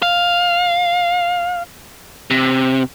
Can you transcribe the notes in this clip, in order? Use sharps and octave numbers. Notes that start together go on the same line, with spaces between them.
F5
C3